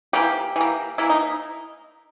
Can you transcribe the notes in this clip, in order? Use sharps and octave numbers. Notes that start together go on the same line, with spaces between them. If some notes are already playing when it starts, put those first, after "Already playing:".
E3 A#3 G4
E3 A#3
E3 A#3 E4
D#4